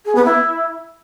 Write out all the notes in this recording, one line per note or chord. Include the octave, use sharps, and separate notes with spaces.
G#4
B3
E4